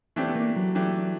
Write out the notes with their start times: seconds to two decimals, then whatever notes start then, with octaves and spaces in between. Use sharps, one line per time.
0.16 E3 A3 C4 D4 G4
0.28 B3
0.35 A#3
0.56 F#3
0.75 E3 A3 D4 G4